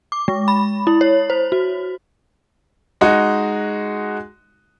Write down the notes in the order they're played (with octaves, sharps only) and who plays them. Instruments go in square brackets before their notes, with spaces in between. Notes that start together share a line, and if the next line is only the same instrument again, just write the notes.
[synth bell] D6
G#3
B5
E4
C#5
C5
F#4
[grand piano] G#3 D#4 F#4